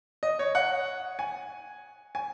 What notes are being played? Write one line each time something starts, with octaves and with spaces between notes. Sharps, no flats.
D#5
C#5
F#5
G#5
G#5